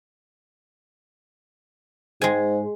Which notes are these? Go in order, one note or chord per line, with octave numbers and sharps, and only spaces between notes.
G#2 G#3 G#5